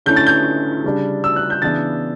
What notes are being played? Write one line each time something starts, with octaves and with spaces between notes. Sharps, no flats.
D3 A3 C#4 E4 G6
A6
G6
C#3 G3 D4
E6
F#6
G6
C#3 E3 B3 D4 A6